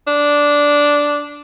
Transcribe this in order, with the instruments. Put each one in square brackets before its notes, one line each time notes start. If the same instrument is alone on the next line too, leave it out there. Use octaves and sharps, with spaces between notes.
[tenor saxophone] D4